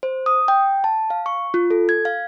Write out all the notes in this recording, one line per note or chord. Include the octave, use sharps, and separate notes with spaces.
C5
D#6
G5
A5
F5
C#6
F4
A4
G#6
F5